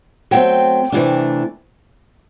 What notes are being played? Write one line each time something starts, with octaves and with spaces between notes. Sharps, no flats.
F#3 A3 C4 G5
C3 E3 A3 D4